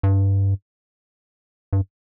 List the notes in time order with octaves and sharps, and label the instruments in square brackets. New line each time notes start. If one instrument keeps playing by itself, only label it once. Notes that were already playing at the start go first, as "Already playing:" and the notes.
[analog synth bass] G2
G2